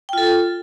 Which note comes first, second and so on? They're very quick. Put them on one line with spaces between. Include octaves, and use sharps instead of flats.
G5 F4 A4